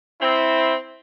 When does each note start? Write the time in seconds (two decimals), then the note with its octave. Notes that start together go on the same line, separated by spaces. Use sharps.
0.21 C4 E4